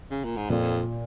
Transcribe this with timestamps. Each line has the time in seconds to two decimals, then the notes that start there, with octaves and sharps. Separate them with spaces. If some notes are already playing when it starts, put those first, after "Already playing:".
0.11 C#3
0.25 A#2
0.37 G#2
0.50 F2 A#2